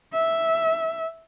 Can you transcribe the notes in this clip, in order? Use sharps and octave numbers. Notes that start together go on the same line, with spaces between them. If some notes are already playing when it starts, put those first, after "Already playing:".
E5